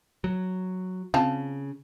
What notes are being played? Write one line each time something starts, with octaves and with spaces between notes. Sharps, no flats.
F#3
C#3 C4 F4 A5